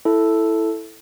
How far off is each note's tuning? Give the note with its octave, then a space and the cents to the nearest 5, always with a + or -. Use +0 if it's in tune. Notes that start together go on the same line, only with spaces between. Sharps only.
E4 +0 A4 +0